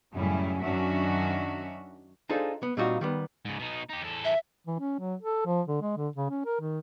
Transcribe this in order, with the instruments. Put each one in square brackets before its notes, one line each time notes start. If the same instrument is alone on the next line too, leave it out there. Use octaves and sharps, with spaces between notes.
[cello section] F#2 A2 C#3 G3 C#4 E4
F#2 D#3 C#4 D4 F#4 E5
[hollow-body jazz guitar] D4 D#4 F4 G#4 A4 C5
B3
A#2 G3 C4 D#4 F4 F#4
D#3 G3 B3
[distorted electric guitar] G#2 C#3
B2 D#4
D#4 G4
E2 A4
[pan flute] E5
[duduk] E3
C#4
F#3
A4
F3
D3
G#3
D3
C#3
C#4
A#4
D#3